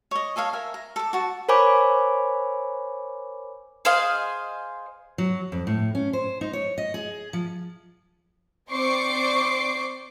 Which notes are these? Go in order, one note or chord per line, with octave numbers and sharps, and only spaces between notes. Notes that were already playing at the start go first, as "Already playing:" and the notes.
C#5 D#5
G#4 A4 C#5 F5
A#4 E5 G#5
A#5
A4 D6
F#4 A5
A#4 C5 C#5 G#5 B5 D6
G#4 C5 D#5 F5
F#3
F2
A2
C#4
C5
D#4
C#5
D#5
G#4
F3
C4 C5 D5 C#6 D6 C7